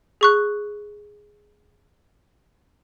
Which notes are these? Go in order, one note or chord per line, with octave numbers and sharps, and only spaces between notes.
G#4 C#6 F#6